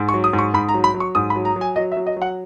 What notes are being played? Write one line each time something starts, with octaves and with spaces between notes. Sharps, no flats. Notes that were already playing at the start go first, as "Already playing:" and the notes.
Already playing: G#2
C#6
F#3
D#6
G#2
C#6
G#2 B5
A#5
F#3
B5
F#3
C#6
G#2 D#6
B5
F#3
A#5
F#3
G#5
F#3 D#5
E5
F#3
D#5
F#3
F#5